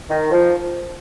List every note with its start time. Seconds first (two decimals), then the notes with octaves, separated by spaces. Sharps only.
0.10 D#3
0.31 F3